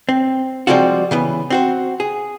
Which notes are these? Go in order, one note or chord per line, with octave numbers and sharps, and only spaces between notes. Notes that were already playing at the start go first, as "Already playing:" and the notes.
C4
F3 G3 G#3 C4 F4 F#4
C#3 E3 B3
C4 F#4 C5
G#4